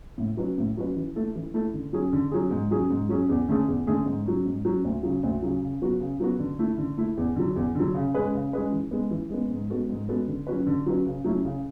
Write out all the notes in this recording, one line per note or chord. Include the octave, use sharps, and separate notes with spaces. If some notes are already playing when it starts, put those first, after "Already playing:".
A2
F#3 C#4 F#4 B4
A2
F#3 C#4 F#4 B4
E3
A3 E4 A4
E3
A3 E4 A4
D3
F#3 C#4 G#4
D3
F#3 C#4 G#4
G#2
F#3 C#4 G#4
G#2
F#3 C#4 G#4
E2
D3 A3 C#4 G#4
E2
D3 A3 C#4 G#4
G#2
F#3 C#4
G#2
F#3 C#4
D2
C#3 F#3
D2
C#3 F#3
C#3
F#3 B3 F#4
C#3
F#3 B3 F#4
D3
A3 E4
D3
A3 E4
E2
D3 F#3
E2
D3 F#3
C#3
G#3 C#4 G#4 B4
C#3
G#3 C#4 G#4 B4
E3
G#3 B3
E3
G#3 B3
G#2
G#3 B3 F#4 A4
G#2
G#3 B3 F#4 A4
D3
F#3 C#4 F#4 B4
D3
F#3 C#4 F#4 B4
C#3
F#3 A3 C#4 E4
C#3